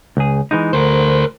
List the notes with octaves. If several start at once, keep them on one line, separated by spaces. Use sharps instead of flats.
C#2 G#4
E3 G#3 D#4
D2 A#4 C5